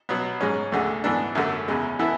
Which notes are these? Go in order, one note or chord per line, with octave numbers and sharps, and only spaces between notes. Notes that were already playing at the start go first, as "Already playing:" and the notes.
B2 F#3 B3
G#2 G#3 C#4
D2 D3 G#3
G#2 E3 B3 D4 A4
F#2 D3 A3
E2 C#3 G#3
E3 B3 E4 A4 E5